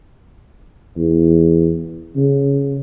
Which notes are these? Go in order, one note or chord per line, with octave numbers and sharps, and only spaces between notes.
E2
C#3